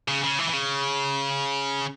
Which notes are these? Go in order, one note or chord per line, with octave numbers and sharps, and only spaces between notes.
C#3
C#3
E3
E3
C#3